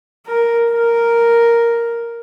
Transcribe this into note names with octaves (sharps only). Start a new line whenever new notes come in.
A#4
A#4